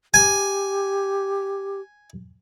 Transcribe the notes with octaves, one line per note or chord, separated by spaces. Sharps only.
G4 G#5